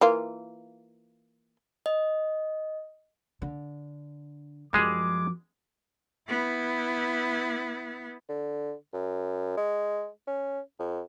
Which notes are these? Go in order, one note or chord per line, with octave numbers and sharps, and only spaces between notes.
E3 A#3 F4
D#5
D3
F#2 F3 G3 G#3 G#4 D6
B3 E4
D3
F#2
G#3
C#4
F2